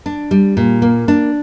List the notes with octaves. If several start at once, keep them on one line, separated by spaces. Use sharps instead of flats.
D4
G3
A#2
A#3
D4